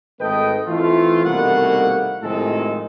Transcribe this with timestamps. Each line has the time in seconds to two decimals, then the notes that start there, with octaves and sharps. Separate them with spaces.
0.20 G#1 A3 A4 B4 D#5 G5
0.67 E3 A3 C4 E4 F4
1.24 C2 B2 D#3 A3 A#3 F#5
2.23 A2 C3 D#3 F3 G#3 A4